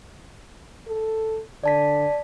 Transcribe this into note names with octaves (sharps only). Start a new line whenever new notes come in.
A4
D3 D5 A5 B6